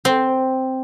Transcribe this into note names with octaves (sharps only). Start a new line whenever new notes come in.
C4